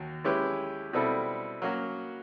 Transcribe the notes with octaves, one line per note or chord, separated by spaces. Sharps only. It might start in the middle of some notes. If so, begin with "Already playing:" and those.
Already playing: D#2 F#3
G#3 C#4 E4 G4 B4
B2 G3 C4 E4 A4
F#3 A#3 C#4 F#4